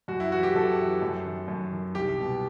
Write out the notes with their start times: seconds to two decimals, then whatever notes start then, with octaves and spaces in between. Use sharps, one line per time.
0.08 F#2 F#4
0.20 E4
0.31 E3 F#4
0.43 G4
0.55 F#2 A4
0.79 E3
1.02 F#2
1.25 D#3
1.48 F#2
1.72 D#3
1.95 C2 G4
2.19 B2